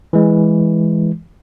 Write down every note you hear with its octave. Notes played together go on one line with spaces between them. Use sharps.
E3 G#3